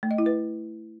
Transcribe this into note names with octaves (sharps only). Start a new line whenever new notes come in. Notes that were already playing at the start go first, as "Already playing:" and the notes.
A3
D#5
E4
B4